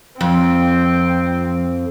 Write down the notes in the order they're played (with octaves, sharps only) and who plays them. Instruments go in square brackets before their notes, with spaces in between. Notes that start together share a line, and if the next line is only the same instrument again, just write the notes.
[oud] F2 [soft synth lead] F3 [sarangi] C4